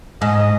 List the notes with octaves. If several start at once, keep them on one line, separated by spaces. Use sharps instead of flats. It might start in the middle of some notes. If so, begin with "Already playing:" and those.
G#2 D#5